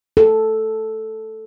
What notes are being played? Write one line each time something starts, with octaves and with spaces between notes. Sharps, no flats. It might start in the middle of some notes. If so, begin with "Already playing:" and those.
A4